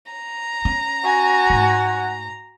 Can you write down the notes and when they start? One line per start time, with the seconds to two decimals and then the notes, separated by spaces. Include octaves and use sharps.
0.12 A#5
0.65 C#4
1.04 F#4 F#5 G#5
1.50 G#2 A3